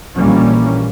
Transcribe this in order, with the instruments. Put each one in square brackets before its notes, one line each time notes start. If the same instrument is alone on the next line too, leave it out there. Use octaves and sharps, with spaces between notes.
[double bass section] A#1 E3 G3 A#3 C#4